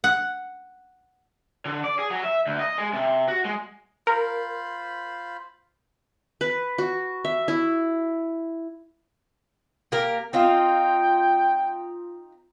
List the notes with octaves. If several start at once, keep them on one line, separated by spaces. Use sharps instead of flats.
F#5
D3
D5
G#4
F#3
E5
D2
D#5
G#3
C3
F#4
G#3
F4 A#4 C5 B5
B4
F#4
E5
E4
A#3 G4 A#4
C4 D#4 F4 G5